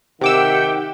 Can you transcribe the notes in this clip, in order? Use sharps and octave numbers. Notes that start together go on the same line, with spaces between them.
C3 D#3 G4 E5 F#5 G5 D6 E6